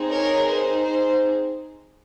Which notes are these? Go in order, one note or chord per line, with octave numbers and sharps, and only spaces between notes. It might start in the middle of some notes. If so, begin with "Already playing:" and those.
Already playing: C4 D#4 G#4
A#4 C#5
C5
C5